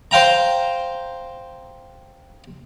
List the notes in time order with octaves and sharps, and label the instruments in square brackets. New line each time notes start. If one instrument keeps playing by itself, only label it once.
[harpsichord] C5 F5 G5 A#5